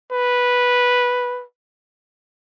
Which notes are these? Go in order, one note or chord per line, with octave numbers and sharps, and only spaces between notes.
B4